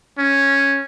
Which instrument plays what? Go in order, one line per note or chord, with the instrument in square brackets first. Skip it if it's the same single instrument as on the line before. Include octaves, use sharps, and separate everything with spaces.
[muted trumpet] C#4